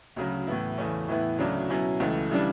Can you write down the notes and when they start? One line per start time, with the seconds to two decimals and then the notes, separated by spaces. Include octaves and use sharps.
0.16 D2 C#3 F#3
0.47 A2 E3 B3 E4
0.78 E2 C#3 E3 A3 C#4
1.08 A2 E3 B3 E4
1.38 D2 C#3 F#3 A3 D4
1.70 B2 F#3 C#4 E4
2.00 C#2 C#3 E3 A3
2.31 C#3 E3 G3 D4